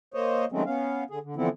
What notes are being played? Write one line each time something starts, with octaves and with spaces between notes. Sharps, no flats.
A#3 C5 C#5 D#5
D#3 F#3 G#3 A3 C4 C#4
B3 C#4 F5
D3 G#4
D3
D3 E3 F3 B3 C4 E4